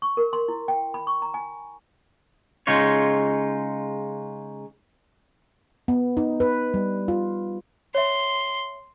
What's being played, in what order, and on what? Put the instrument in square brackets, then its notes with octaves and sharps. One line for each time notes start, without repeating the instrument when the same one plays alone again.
[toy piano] C#6
A#4
C6
E4
G5
B5
C#6
A#5
G#5
[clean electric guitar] C#3 G#3 D#4 F4 C#5
[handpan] B3
D#4
B4
G3
F4
[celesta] C#5 E5 [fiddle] C6